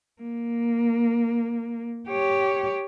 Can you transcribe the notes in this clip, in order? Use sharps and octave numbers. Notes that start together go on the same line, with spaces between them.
A#3
G4 C#5